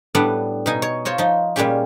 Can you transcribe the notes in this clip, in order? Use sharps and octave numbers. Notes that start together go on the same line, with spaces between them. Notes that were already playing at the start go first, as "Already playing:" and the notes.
A2 G3 B3 D4 F#5
B2 D#4 G#5
C#5
F4 C5 C#5 D#5
F3 D#4
A#2 G3 G#3 C#4 G4